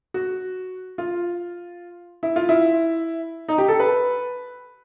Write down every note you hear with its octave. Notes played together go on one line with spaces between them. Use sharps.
F#4
F4
E4
F4
E4
D#4
G4
A4
B4